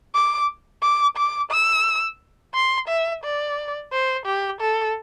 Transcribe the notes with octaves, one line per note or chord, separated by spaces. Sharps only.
D6
D6
D6
E6
C6
E5
D5
C5
G4
A4